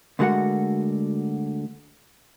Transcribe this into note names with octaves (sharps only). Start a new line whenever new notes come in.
D2 D3 G#3 F#4 A#4 F#5